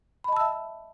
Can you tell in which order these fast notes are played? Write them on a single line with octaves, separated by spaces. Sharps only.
B5 D#5 A5 E6 E5